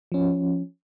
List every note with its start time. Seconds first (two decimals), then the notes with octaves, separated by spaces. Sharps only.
0.12 F3 C#4